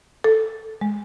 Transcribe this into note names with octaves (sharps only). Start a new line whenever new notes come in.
A4
G#3